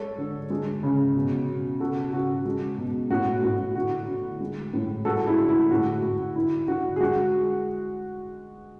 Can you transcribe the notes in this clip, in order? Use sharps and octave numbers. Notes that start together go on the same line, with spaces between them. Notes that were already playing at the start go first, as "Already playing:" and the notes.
Already playing: G#3 A4 C#5
D3
G#3
C#3
B2
B2
C#3 F#4 A4
C#3 F#4
G#3
B2
A2 F#4
A2 F#4
D3 F#4
D3
G#3
A2
G#3 F#4 A4
E4 G#4
D3
E4
A2 F#4
A2
D3 E4
D3 F#4
G#4
G#3 F#4